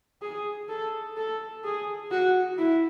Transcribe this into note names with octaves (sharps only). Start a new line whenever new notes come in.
G#4
A4
A4
G#4
F#4
E4